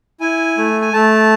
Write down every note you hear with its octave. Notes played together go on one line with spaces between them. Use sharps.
E4 G#5
A3
G#5
A3 A5